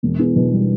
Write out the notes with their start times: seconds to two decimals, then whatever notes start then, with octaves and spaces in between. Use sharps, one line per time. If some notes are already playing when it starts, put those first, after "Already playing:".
0.03 E1
0.19 E2
0.36 B2
0.53 G3